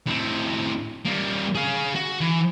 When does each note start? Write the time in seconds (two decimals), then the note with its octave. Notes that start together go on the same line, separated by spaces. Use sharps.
0.07 A2 C4
1.05 G3 A#3
1.55 G#4 F5
1.95 F#4
2.21 E3